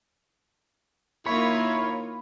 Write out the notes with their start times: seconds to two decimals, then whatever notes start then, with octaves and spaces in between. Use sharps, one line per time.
1.26 D#3 A#3 E4 F4 C#5 B5